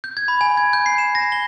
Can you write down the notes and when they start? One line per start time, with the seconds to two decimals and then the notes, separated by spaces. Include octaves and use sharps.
0.04 G6
0.17 G#6
0.28 B5
0.41 G#5
0.57 G#6
0.73 G6
0.86 C7
0.98 E7
1.15 A#6
1.32 G7